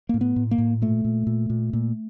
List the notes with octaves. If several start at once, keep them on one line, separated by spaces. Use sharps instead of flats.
A2 A#3
B3
A2
A#3
A2
A#2 A3
A#2
A#2
A#2
A#2